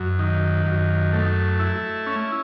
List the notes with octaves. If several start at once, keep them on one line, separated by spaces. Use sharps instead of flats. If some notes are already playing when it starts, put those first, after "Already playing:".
Already playing: F#2
D#3
F#2
A3
E4
C#4